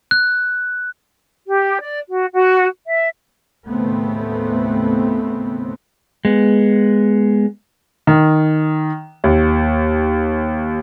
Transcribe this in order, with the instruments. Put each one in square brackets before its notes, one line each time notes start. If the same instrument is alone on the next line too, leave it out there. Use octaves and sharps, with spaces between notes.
[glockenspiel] F#6
[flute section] G4
D5
F#4
F#4
E5
[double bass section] D#2 A2 C#3 A3 B3 C4
[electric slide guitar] G#3 B3
[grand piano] D#3
D#2